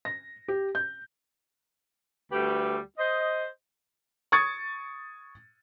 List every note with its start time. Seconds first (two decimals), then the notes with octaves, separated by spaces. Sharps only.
0.05 A#6
0.48 G4
0.75 G6
2.32 D2 G3 A3 G4 B4
2.98 C5 D#5
4.32 C#6 D#6 G#6 A6 C#7